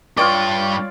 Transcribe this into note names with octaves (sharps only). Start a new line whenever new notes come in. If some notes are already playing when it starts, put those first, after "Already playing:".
G2 F4 C#5 D5 G5